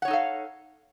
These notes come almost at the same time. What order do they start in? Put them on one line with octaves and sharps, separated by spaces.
F#5 C#5 D#4 A4 F5